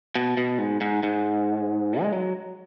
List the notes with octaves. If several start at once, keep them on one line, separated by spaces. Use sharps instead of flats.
B2
B2
G#2
G#2
G#2
G#3
F#3